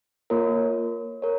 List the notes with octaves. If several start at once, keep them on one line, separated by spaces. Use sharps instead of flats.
A#3 F4 A#4 C#5
A#4 C#5